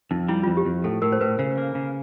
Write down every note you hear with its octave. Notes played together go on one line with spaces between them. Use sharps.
F2 D#4
G3 E4
F2 F4
G4
F2
A2 A4
A2 A#4
C5
A2 B4
C#3 C5
A#3
C#3